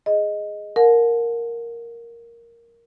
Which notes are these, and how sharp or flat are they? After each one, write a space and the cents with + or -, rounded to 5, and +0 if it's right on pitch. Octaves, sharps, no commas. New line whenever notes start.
G#4 +0 D#5 +0
A#4 +0 F#5 -40 A5 -40